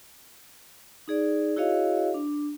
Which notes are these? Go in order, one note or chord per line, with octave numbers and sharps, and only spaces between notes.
D#4 G#4 D5
E4 F#4 G#4 C#5 D#5 F5
D4